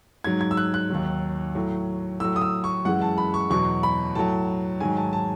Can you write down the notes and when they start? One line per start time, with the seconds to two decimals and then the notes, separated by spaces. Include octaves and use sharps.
0.24 G#2 F#3 G#6
0.41 G#6
0.51 E6
0.57 F#6
0.74 F#6
0.90 D#2 D#3 F#3
1.55 A2 F#3
2.20 A2 F#3 E6
2.36 D#6
2.41 E6
2.64 C#6
2.85 F#2 E3 G#3 F#5
3.01 A5
3.18 B5
3.34 C#6
3.50 E2 B2 F#3 C#6
3.83 B5
4.15 A2 F#3 A5
4.80 G#2 D#3 F#3 G#5
4.97 A5
5.13 A5